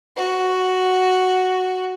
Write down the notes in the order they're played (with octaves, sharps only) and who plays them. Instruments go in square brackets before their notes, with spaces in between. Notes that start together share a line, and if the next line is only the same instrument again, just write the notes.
[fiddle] F#4